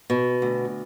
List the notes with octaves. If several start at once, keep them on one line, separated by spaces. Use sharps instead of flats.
B2
D2